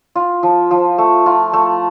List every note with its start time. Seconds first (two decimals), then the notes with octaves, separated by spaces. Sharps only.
0.15 F4
0.43 F3
0.71 F3
0.98 A3
1.26 F4
1.53 A3